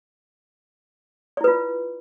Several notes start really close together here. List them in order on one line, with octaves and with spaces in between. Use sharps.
D5 E4 B4 F4